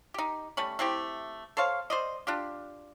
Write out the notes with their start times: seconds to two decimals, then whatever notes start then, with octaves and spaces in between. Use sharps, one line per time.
0.14 D#4 G4
0.57 G3 A3 C#4 B5
0.79 A3 C4 E4 G4
1.57 A4 C5 C#5 F5
1.90 C5 D5 D#5
2.27 D4 F4 G4